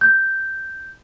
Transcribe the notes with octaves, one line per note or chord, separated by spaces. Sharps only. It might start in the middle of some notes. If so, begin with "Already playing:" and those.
G6